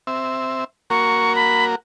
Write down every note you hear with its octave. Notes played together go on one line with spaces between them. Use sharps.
C4 E5
A#3 F#4 A#4 C#6
B5